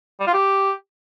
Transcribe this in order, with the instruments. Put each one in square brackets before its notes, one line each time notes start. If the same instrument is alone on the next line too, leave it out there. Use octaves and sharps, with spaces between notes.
[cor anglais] G3
F4
G4